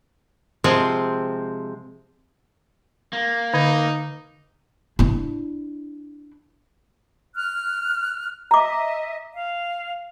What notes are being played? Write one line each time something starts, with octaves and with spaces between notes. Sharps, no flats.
C3 F3 G#3 C4
A#3
D3 D#4
D4 E4
F6 F#6
D#5 E5 A#5 D6
F5